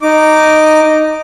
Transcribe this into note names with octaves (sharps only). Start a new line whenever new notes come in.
D#4 D6